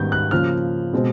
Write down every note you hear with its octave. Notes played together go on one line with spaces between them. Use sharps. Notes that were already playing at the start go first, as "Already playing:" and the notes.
Already playing: G#2 D#3 G3 B3 G6
F#6
C#3 F3 A#3 F6
B2 G#3 C4